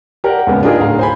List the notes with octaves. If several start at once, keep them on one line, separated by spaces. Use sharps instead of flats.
G4 A#4 D5 F#5
D#2 G#2 C#3 A#3 B3
D4 D#4 F4 G4 G#4 A#4
D1 F5 A#5
C5 G#5 B5